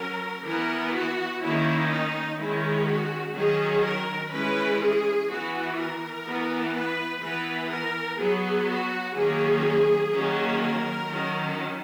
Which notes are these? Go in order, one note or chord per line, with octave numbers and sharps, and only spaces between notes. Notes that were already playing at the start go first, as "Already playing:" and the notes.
Already playing: F#3 C#4 A#4
E3 B3 A#4
F#4
D#3 A#3 C#4 E4
D#4
D#3 G#3 C#4 E4
F#4
D#3 F#3 C#4 G#4
A#4
E3 G#3 C#4 B4
G#4
E3 B3 F#4
A#4
E3 B3
B4
E3 B3 B4
A#4
F#3 B3 G#4
F#4
D#3 F#3 A#3 C#4 G#4
D#3 F#3 A#3 C#4
A#4
D#3 F#3 C#4